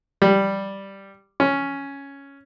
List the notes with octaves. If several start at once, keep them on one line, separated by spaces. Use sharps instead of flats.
G3
C#4